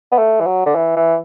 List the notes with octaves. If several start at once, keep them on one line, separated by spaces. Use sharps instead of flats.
B3
A3
E3
F#3
D3
E3
E3